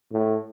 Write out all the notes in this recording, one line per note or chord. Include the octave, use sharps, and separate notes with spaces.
A2